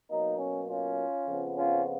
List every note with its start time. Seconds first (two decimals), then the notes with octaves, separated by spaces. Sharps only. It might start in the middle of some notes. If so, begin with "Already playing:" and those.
0.10 B2 F#3 A#3 D#4
0.38 C#4
0.68 C#4 F4
1.27 F2 C#3 F3 B3
1.56 C#4 F4